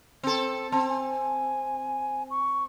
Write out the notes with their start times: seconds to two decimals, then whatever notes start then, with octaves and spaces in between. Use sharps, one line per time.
0.23 C4 A4
0.72 C4 A5
0.89 G#5
2.30 C#6